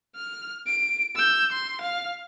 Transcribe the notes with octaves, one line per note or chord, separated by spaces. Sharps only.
F6
D7
E6 G6
C6
F5